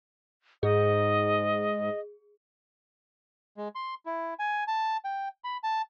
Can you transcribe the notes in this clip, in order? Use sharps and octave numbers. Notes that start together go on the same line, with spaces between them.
G#2 G#4 D#5
G#3
C6
E4
G#5
A5
G5
B5
A5